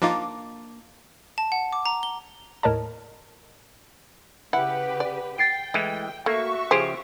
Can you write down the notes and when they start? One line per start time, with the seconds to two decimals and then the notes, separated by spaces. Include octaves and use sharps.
0.02 F3 A#3 D4 D#4 F4
1.38 A5
1.52 F#5
1.73 D6
1.86 A#5
2.03 G7
2.63 D#2 A2 A#4 C#5 D#5 A5
4.53 C#3 E4 G4 B4 F#5
5.00 D5
5.38 G5 A6 C7 D7
5.74 E3 G#3 A3 E4
6.26 A3 A#3 F#4 E5 C#6
6.71 C#3 F3 G4 G#4 C5